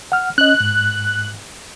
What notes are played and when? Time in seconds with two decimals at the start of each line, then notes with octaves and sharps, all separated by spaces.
0.12 F#5 F6
0.38 C#4 D#5 F#6
0.60 G#2